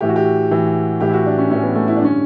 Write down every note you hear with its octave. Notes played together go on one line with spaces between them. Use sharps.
A2 E3 G4
F#4
G4
A2 E3
A2 E3 G4
E4
F#4
D4
C#4
A2 E3 C#4
B3
A3
E4
D4
G2 D3 C#4